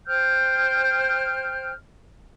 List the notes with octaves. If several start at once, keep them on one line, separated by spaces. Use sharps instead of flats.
C5 G5 F6 G6